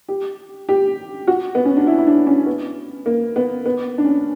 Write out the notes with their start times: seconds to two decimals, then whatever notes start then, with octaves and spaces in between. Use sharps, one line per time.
0.08 G4
0.69 G4
1.28 F#4
1.55 B3
1.65 C#4
1.77 D4
1.87 E4
1.98 E4
2.07 D4
2.27 C#4
2.46 B3
3.06 A#3
3.36 B3
3.66 B3
3.98 D4
4.05 C#4